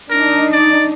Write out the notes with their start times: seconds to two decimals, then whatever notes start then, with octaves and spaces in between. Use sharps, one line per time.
0.10 D4 D#4 A#4
0.52 D5